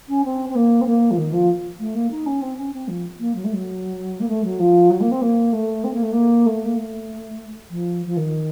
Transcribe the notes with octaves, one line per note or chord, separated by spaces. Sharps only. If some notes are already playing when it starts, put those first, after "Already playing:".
C#4
C4
C4
A#3
C4
A#3
F3
D#3
F3
A3
A#3
D#4
C#4
C4
C#4
C4
F3
A#3
F#3
A3
F#3
A#3
A3
F#3
F3
F#3
A#3
C4
A#3
A3
C4
A#3
A3
A#3
A3
A#3
A3
F3
F3
D#3